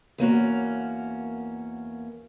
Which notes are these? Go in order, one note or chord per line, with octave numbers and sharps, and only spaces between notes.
E2 A#3 C#4 F#4